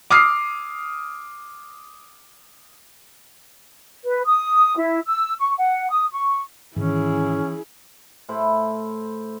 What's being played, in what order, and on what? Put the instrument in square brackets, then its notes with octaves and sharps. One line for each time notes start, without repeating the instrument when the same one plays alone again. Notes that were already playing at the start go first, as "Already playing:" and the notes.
[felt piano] D6 D#6 F6 C7
[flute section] B4
D#6
E4
E6
C#6
F#5
D#6
C#6
[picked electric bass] G#2 D#3 [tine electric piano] E3 [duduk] C#4 [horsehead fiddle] E4 G#4
[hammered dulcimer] A2 E4 C5 B5